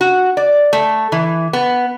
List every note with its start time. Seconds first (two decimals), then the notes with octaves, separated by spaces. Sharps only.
0.01 F#4
0.37 D5
0.73 A3
1.12 E3
1.53 B3